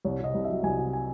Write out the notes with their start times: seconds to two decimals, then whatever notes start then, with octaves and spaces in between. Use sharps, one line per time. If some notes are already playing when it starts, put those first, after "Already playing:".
0.05 C2 C#5
0.20 C3 D#5
0.34 C2
0.44 F#3 E5
0.63 C2 G#5
0.79 C3
0.93 G#5